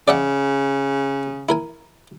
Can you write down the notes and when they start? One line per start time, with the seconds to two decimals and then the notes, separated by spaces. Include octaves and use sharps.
0.08 C#3 D5 E5 F#5
1.49 E4 A#4 G#5